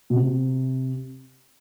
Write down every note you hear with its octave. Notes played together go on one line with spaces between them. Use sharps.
B2
C3